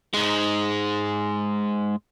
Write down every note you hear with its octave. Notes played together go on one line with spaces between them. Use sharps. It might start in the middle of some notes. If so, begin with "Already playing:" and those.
G#2 G#3